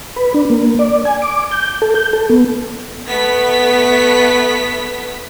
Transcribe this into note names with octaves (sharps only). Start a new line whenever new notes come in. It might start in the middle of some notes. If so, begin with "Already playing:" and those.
B4
D4
A#3
D5
G#5
D6
G6
A4
G6
A4
B3
A3 B3 B6